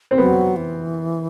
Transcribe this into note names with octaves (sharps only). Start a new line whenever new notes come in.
C4
F#3 B3
E3